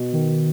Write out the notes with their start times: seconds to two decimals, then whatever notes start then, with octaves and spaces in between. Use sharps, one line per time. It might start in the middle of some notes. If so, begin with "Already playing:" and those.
Already playing: B2
0.13 D#3